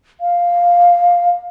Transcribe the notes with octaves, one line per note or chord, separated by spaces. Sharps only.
F5